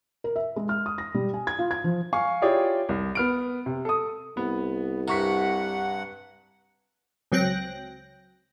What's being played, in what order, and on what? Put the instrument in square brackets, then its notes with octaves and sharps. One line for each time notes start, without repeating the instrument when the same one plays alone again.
[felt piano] A#4
E5
G#3
F6
D#6
A#6
G3
G#5
G#6
F4
G#6
F3
[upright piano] F5 G#5 C#6
E4 F4 G4 G#4 C#5 D5
C2
B3 F6 D7
C3
A4 D#6
[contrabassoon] C2 [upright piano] B3
[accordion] G2 F#5 [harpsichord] C3 [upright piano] A#5 C#6 B6
[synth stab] C#2 F#3 C4 G5 F#6 A#6